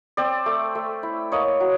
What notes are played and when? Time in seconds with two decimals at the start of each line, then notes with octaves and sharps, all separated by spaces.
0.17 C4 C5 D5
0.46 A3
0.75 A3
1.03 E4
1.32 A#3 C#5 D#5
1.60 F#3